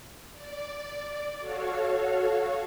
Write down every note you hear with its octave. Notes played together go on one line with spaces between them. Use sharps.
D5
F#4 A4 C#5 F5